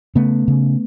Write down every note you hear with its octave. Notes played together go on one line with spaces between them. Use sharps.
C#3 A3 B3
C#3